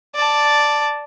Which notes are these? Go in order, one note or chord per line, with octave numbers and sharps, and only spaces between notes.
D5 A5